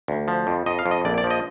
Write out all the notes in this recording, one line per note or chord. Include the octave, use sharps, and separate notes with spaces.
D2
F3
F2
F2 D#5
F5
F2
D#5
A#1 D5
D5
F3
D#5